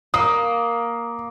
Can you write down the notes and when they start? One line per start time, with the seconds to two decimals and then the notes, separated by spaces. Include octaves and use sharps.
0.14 A#3 D#6